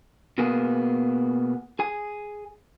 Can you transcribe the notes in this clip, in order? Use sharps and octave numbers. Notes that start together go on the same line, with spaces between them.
B2 A#3 B3 G#4
G#4 G#5